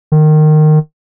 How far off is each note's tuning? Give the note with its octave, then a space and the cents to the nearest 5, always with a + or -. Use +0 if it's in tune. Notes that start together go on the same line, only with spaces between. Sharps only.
D#3 -20